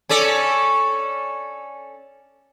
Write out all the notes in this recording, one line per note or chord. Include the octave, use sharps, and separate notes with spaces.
C#4 A4 D5